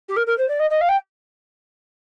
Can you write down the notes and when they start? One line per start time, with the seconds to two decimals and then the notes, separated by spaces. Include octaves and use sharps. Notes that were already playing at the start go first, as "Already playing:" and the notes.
0.08 G4
0.16 A#4
0.26 A#4
0.38 C5
0.48 D5
0.59 D#5
0.70 D#5
0.81 F5
0.88 G5